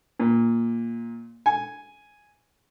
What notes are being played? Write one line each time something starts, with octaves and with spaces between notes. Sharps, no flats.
A#2
G#5